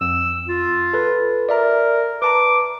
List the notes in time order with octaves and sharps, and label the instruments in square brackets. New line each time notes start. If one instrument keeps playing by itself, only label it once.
[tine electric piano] F2 [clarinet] E6
[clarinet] F4
[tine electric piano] A4 B4
[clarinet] A#4 [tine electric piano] D5 E5 A#5
[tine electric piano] B4 A5 A#5 [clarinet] D6